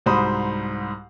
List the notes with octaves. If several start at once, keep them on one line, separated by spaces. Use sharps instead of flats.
C2 G#2 F#4 C5 B5 D#6